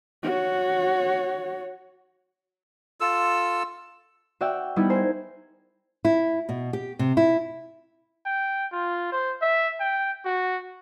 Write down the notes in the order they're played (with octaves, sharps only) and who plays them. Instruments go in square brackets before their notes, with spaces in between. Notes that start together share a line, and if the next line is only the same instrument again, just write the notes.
[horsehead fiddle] F#4 C#5
[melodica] F4 A4 E6
[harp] F#4 D5 E5 G5
G3 B3 D#4 E4
A#4 C5 G#5
[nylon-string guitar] E4
B2
G4
C3
E4
[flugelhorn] G5
F4
C5
E5
G5
F#4